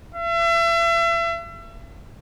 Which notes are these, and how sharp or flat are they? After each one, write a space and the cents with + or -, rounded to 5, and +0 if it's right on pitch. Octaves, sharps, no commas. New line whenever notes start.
E5 +35